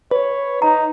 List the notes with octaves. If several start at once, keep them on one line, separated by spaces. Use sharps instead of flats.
B4 C#5
D#4 A#5